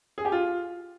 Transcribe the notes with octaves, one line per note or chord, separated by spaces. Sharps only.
G#4
G4
F4